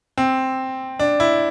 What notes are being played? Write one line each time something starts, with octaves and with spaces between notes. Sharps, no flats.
C4
D4
E4